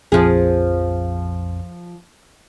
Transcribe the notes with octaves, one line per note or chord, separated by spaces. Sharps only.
A#1 F2 F3 G#4